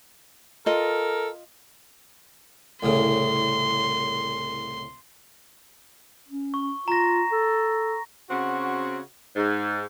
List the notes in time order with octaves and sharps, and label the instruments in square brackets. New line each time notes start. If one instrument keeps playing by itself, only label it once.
[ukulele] F4 D#5 [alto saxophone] A4 [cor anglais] A#4
[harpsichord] C2 A2 C#3 [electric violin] C6
[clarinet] C#4
[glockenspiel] C#6
[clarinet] F4 [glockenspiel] A#5 A#6
[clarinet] A4
[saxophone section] C#3 C4 F#4
G#2